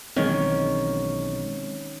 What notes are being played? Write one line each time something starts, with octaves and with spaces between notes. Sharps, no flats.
B1 D#3 E3 G#3 C4 C#4 C#5